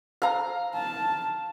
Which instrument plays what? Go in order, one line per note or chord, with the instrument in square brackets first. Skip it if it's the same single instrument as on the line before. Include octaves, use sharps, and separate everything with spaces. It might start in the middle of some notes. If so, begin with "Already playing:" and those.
[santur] F5 A#5
[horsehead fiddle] A5